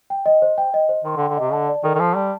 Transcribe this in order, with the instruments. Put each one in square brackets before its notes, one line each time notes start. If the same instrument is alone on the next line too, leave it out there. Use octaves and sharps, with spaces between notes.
[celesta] G5
D#5
C5
G5
D#5
C5
[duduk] D#3 [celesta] C6
[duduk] D3
[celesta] G5
[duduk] D3
[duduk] C3 [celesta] D#5
[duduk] D3 [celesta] A5
[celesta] D5
[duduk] D#3 [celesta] A4
[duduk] D#3
[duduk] F3 [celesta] C6
[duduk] G3 [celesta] A5